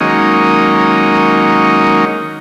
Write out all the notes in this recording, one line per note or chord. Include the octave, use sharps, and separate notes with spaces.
D#3 F#3 G#3 A#3 C#4 D#4